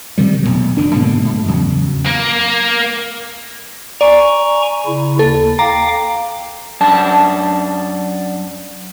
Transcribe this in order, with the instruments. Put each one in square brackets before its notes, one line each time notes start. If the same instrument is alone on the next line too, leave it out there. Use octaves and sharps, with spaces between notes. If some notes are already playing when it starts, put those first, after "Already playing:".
[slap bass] C3 D#3 G3
D1 C#2 B2 F#3
F1 D#3 D4
G#2 B2 D3 A#3
G#2
E2 C#3 F#3
[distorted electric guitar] A#3
[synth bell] D5 [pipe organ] G#5 A#5 C#6
[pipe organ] C#3 E4
[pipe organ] D#2 [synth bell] A4
[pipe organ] F5 G5 D6 [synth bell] A#5
[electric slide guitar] F#2 D4 A5